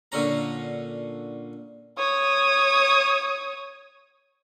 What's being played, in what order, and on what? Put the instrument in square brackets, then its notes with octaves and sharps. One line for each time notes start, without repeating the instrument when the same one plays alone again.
[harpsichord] A#2 D3 C#4 A#5
[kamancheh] C#5 D#6